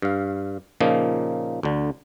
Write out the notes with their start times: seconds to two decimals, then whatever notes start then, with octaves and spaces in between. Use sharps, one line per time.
0.02 G2 F5
0.80 A#2 C#3 F3 A#3 D#4
1.63 D2 D3